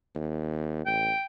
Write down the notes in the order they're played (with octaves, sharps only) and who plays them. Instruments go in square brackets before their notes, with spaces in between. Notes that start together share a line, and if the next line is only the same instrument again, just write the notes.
[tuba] D#2
[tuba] A1 [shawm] G5